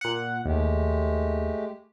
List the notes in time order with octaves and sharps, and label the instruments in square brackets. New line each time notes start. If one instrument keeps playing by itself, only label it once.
[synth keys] A#2 F#5
[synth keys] D#2 [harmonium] G#3 A3 G4